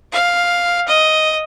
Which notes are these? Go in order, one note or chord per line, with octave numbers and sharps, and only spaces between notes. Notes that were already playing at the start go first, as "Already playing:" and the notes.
F5
D#5